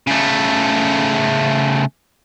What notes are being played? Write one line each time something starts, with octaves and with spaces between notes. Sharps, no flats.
C#3 A3